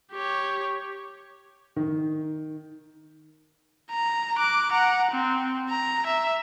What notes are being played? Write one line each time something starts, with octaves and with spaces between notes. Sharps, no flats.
G4 C#5
D#3
A#5
D6 F#6
F#5 A#5
C4
A#5
E5